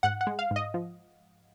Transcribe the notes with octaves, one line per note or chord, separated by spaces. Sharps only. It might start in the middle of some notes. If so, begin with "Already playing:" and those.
G#2 F#5
F#5
G#3
F5
G#2
D#5
F3